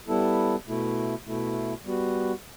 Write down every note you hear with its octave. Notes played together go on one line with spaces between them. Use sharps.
G3 B3 E4 A4
B2 A3 E4
B2 A3 E4
G3 B3 F#4